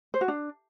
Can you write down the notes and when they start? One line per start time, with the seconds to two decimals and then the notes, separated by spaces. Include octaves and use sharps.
0.14 C5
0.21 F#4
0.28 D4